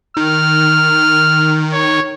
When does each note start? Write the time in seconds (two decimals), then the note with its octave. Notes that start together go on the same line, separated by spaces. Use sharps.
0.17 D#3 F6
1.73 C#5